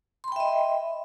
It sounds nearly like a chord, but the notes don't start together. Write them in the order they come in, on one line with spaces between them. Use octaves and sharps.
C6 B5 G5 E5 D#5